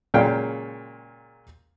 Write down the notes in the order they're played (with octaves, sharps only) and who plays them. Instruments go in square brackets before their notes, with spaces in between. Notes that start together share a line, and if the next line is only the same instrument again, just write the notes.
[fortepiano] A#2 C#3 F#3 G#3 F5 G5